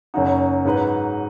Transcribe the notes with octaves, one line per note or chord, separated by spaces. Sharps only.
F#1 F#2 F#3 D#4 F#4
G#2 F#3 D#4 B4